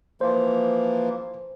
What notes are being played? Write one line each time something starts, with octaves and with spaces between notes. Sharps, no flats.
E3 F3 A#3 C5